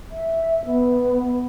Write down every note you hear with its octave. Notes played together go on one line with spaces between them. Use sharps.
E5
B3